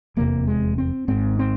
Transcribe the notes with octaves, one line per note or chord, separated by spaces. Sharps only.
F1 E2 C3 A#3
G#3
C4
G#1 G#2 C4
C4